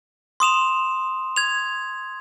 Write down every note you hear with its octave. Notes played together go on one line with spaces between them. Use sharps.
C6 D#6 E7 F7
G#6 F7